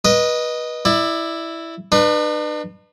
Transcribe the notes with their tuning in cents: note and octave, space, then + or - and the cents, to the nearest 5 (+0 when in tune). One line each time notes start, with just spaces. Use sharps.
B4 -25 D#5 +0
E4 +0 D5 +25
D4 +45 B4 -5